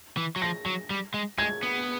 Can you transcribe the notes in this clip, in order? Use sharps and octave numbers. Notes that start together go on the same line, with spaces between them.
E3
F#3
F3 A#6
F#3
G3
G#3
G#3 G#6
B3